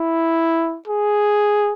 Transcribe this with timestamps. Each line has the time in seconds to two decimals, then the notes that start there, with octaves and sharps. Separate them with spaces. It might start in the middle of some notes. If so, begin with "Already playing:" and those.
Already playing: E4
0.88 G#4